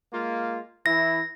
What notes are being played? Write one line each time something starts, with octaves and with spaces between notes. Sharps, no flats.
G#3 A#3 F4
E3 E4 A#6